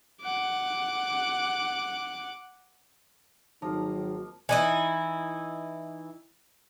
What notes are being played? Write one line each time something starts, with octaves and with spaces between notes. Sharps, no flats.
F#5 D6
G#1 D#3 F3 F#3 A#3 A#5
E3 D#4 E4